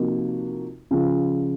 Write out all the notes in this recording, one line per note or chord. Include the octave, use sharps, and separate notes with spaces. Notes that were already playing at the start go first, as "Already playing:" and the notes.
Already playing: C3 F3 A#3 D#4 F#4
C#3 F3